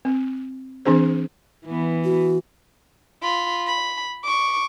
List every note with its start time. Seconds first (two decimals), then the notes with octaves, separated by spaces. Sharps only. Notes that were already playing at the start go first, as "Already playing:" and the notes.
0.05 C4
0.85 E3 C4 D4 G#4 C5
1.66 E3 B3
2.04 F#4
3.22 F4 B5
3.67 B5
4.24 C#6 D6